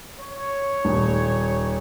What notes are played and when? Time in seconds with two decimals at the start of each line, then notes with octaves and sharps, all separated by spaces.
0.19 C#5
0.85 D#1